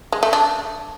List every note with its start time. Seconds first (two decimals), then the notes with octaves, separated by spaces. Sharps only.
0.12 G#3
0.23 A3
0.33 D4